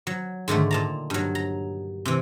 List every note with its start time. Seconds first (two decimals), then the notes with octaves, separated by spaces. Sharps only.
0.07 F#3
0.48 G#2 D3 D#3 A3
0.71 A#2 A5 A#5
1.10 G2 F#3
1.35 A#5
2.05 C3 E3